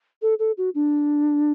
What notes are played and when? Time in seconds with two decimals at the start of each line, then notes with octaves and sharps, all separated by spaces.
0.22 A4
0.39 A4
0.58 F#4
0.75 D4